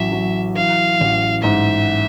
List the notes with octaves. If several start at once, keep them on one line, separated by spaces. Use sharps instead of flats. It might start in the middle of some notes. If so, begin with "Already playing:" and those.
Already playing: A1 F#3 E5
F#3
E3 F5
A1
G#2 E5